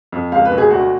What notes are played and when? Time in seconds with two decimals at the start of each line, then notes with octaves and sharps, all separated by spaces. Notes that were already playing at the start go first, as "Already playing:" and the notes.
0.12 F2
0.32 C#2 F5
0.45 B4
0.52 B2
0.58 G#4
0.70 D2 F#4